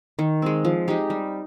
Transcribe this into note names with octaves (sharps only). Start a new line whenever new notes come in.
D#3
G#3 C4
F3
G#3 D#4 G4
G3